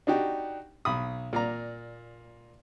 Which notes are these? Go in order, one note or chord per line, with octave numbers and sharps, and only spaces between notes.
D4 D#4 F#4 G4
B1 B5 D#6
A#2 D5 A#5